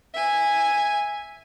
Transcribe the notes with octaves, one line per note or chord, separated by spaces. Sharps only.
E5 G#5